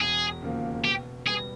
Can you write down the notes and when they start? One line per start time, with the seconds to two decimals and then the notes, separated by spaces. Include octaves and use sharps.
0.01 E1 G#4
0.42 D#2 C#3 F3 A#3
0.84 B2 G4
1.26 G3 G#4
1.30 B3